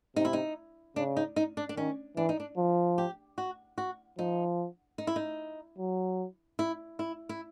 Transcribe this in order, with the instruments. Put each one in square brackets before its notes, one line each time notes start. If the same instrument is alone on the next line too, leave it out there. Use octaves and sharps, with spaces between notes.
[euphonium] C3 [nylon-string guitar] D#4
[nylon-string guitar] E4
D#4
[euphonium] C#3 [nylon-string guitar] D4
[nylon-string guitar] D#4
D#4
D4
D4
[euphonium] D#3 [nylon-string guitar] C#4
[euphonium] E3 [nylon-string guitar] D4
[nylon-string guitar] D#4
D4
[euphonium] F3
[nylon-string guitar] G4
F#4
F#4
[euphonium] F3 [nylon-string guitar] D#4
[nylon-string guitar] D#4
E4
D#4
[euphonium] F#3
[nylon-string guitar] E4
E4
E4